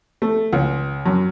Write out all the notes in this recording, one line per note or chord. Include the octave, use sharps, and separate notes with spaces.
A3
C#2
F#2